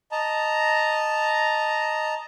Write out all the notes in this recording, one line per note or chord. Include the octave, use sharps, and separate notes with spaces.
D#5 A5 A#5